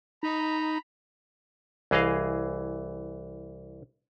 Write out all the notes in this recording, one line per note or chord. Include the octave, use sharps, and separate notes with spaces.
D#4 A#5 B5
C2 E3 G#4 D#5 F5